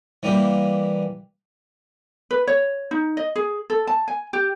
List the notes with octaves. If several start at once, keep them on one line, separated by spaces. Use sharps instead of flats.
E3 G3 A#3
B4
C#5
D#4
D#5
G#4
A4
A5
G#5
G4